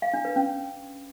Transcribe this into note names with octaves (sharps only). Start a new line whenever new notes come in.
F5
D4
B4
C#4